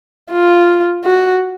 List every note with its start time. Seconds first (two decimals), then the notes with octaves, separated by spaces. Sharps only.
0.31 F4
1.05 F#4